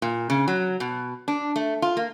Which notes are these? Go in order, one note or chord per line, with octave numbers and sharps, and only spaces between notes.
A#2
C#3
F#3
B2
D4
A3
F4
A#3